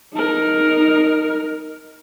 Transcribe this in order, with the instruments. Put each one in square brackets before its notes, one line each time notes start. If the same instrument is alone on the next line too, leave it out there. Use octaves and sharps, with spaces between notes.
[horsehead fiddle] D#4 A#4